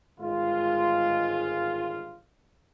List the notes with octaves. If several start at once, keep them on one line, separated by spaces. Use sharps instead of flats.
G1 G#2 D#3 G#3 F4